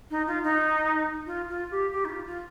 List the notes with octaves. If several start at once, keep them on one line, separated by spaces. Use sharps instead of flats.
D#4
F4
D#4
F4
F4
G4
G4
D#4
F4
F4